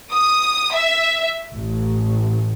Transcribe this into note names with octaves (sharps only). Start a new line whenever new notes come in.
D#6
E5
A1